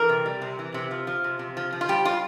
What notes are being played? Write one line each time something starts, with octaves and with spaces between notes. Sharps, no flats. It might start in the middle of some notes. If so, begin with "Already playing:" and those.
Already playing: E3 A#4
C3
G3
C3
E3
C3
F3
F3
C3
C3
F3
F3
F4
G3 G4
G3 F4